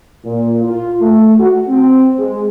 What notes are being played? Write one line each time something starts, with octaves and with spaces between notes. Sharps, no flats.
A#2
F4
A3
F#4
C4
G#3